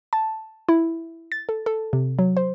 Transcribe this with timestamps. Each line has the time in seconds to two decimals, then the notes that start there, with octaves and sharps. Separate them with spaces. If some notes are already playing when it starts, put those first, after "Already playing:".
0.13 A5
0.69 E4
1.32 A6
1.49 A4
1.66 A4
1.93 C3
2.19 F#3
2.37 C5